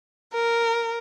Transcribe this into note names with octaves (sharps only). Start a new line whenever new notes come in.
A#4